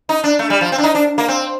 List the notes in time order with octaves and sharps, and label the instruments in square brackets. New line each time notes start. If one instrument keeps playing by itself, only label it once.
[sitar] D#4
D4
A3
G3
F3
C4
D4
D#4
D4
A#3
C4